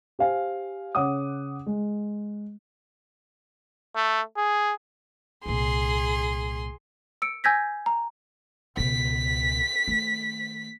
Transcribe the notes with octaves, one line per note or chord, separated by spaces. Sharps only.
G4 C5 F5 G#5
C#3 C#5 F#5 D6 D#6
G#3
A3
G#4
C2 A#2 G#4 C6
E6 C#7 D7
G#5 E6 G6 G#6 A#6 B6
A#5
C#2 B2 B6
D#3 A3